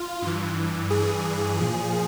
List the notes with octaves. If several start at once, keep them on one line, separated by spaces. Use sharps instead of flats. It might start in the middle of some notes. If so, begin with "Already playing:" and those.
Already playing: F4
G2 E3
G#4
A#2 F3